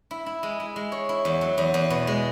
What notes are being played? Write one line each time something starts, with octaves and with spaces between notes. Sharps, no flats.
E4
E4
G#3
E4
G#3
C#5
E4
E2
F#3
E2
E2
B2
G#3